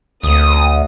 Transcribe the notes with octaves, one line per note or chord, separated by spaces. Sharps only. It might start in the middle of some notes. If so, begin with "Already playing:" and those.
D2 D#6